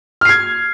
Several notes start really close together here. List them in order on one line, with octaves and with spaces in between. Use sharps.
F6 C7 G#6